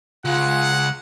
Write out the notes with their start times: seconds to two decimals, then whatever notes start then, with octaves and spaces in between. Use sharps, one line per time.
0.25 C#2 F4 G#4 F#5